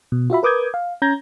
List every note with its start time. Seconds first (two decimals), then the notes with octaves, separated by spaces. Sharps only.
0.12 B2
0.30 F4 F#4 E5 B5
0.43 A#4 B4 D6 D#6 G6 G#6
0.74 F5
1.02 C#4 A#5 G6 G#6 A#6